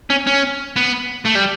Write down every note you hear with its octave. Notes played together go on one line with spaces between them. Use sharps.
C#4
C#4
B3
A3
G3